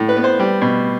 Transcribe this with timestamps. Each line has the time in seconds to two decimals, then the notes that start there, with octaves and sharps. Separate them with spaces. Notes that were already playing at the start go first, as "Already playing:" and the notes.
Already playing: A2
0.09 B4
0.17 B3
0.24 C5
0.39 G3
0.62 B2